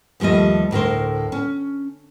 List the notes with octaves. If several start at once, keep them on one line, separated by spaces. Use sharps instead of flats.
D#2 F3 G3 A3 D#5
D2 A2 A#4 C5
C#4